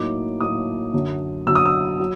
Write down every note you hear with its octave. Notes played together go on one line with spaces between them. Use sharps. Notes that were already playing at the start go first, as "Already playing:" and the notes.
Already playing: A2 F#3 A#3 D#4 D6
A2 F#3 A#3 D#4 D#6
F#2 D3 F#3
F#2 D3 F#3 E6
D#6
E6
F#3